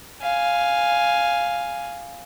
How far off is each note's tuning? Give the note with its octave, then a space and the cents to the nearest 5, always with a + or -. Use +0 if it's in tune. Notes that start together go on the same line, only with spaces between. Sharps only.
F5 +0 G#5 +0